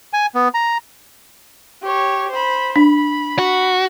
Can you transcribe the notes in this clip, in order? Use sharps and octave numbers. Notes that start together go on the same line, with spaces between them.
G#5
B3
A#5
G4 C#5
C5 B5
D4 B5
F#4